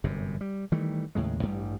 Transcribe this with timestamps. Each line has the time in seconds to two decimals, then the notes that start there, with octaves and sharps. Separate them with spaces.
0.04 G1 F#2 C3
0.41 G3
0.72 D#3 E3 G3 A3
1.15 D#2 A2 C#3 G#3
1.41 A1 G2 G3